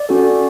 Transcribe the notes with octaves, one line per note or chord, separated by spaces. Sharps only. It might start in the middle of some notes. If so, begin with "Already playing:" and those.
Already playing: D5
C#4 F#4 A4